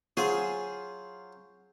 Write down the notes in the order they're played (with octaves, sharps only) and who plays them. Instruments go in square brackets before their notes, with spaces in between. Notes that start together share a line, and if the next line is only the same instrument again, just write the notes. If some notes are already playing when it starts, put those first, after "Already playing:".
[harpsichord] F#3 F4 C5 [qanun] G#4